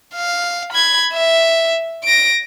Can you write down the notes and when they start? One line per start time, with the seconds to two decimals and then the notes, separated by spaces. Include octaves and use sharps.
0.15 F5
0.73 B5 G#6
1.13 E5
2.04 A#6 D7